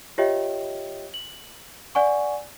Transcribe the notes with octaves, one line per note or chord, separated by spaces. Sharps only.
F4 G4 C#5 D#5 E5 G5
F#7
D5 F#5 G#5 C#6